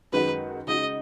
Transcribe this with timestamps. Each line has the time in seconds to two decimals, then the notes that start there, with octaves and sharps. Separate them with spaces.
0.12 F#2 D#3 G#3 D#4 F#4 B4
0.67 C#3 G#3 D#4 F#4 D#5